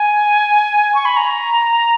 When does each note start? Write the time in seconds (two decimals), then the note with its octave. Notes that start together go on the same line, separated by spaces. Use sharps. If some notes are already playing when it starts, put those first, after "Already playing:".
Already playing: G#5
0.95 C#6
1.05 B5
1.16 A#5